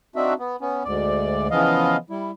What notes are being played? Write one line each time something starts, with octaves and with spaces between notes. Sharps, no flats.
C4 D4 D#4 F#4 E5
B3
B3 C#4
D2 G#2 D5
C#3 E3 F3 B3 D#5 F5
G3 E4